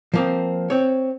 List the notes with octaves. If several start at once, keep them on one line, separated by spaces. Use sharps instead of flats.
F3 A#3 C4
C4 C#5